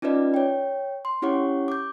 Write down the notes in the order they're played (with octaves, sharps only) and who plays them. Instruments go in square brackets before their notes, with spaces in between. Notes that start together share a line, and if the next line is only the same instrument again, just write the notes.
[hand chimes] C#4 D#4 F4 B4 D5 D#5
C#5 G5
C6
C#4 E4 G4 C#5 F#5 C#6
D6 G6